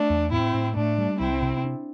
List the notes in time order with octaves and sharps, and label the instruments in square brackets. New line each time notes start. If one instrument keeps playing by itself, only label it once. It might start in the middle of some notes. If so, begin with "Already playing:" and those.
Already playing: [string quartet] A3 D4
[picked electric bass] E2
[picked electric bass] A2 [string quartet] C4 E4
[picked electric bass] A2
[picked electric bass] A2 [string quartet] A3 D4
[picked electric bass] G3
[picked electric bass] C2 [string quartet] C4 E4
[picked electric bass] C3
D4